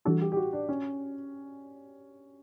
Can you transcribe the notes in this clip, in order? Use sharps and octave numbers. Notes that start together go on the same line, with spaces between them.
E3 G3 D4 F#4 A4
G4
G4
F#4
D4
C#4